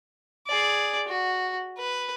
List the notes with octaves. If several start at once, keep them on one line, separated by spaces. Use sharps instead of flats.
G#4 D5
F#4
B4